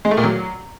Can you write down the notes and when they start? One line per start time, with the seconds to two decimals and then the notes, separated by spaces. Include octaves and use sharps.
0.05 G#3
0.11 A3
0.17 A#2
0.24 F#3